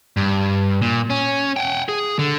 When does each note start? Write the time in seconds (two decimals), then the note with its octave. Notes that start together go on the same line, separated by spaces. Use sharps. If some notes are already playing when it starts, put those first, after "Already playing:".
0.17 G2
0.82 A#2
1.10 C#4
1.56 F#5 G5
1.89 G#4
2.19 D3